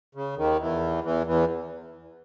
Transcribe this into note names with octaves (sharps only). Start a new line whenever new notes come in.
C#3
D#2 D#3
E2 E3
E2 E3
E2 E3